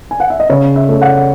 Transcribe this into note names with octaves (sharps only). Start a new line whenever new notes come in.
G#5
F#5
E5
D#5
C#3 C#5
E5
A3
F#5